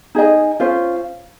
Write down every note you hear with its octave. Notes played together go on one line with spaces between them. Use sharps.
D#4 G#4 D#5 G#5
C#4 F4 C5